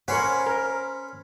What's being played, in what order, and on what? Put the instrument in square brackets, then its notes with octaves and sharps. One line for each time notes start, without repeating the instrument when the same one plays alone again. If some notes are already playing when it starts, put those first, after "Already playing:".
[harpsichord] C#4 B5 C6 [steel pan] A#4 C#5 F#5 [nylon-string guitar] C5
[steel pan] A#4